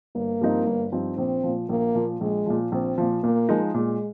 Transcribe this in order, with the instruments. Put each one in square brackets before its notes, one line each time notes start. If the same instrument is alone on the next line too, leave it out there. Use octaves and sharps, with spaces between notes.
[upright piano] G1 [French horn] A#3
[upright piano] G2 F3 C4 D#4
G1
G2 F3 C4 D#4
[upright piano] A#1 [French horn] C4
[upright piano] A#2 F3
[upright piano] A#1 [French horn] A#3
[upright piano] A#2 F3
[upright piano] A#1 [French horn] G#3
[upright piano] A#2 F3
[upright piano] A#1 [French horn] C4
[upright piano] A#2 F3
[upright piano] A#2 [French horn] A#3
[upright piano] F3 G#3 D#4
[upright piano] A#2 [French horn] G#3